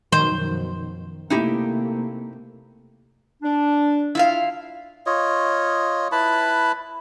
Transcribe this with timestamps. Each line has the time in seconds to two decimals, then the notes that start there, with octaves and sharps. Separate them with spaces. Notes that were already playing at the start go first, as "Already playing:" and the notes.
0.12 F#2 B2 D#3 F3 C5
1.30 C3 A3 A#3 D#4 E4 G4
3.43 D4
4.15 E4 F4 F5
5.06 F4 C#5 D#5
6.12 E4 B4 A5 B5